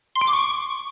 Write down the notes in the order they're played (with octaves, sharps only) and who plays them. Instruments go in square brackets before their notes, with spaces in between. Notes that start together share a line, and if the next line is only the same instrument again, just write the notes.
[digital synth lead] C6
D7
D6
C#6